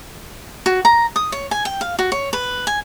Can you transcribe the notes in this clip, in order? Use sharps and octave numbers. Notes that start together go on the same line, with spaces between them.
F#4
A#5
D#6
C#5
G#5
G5
F5
F#4
C#5
B4
G#5